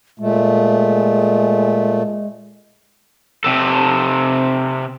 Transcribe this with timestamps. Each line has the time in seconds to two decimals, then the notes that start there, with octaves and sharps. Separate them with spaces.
0.19 A#2 G#3 A3
3.44 C3 A4